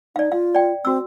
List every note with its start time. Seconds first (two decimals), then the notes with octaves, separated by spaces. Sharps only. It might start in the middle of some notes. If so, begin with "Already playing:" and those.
0.16 D#4 D5 F5
0.32 F4 F5
0.55 D5 G5
0.85 C4 F#4 E6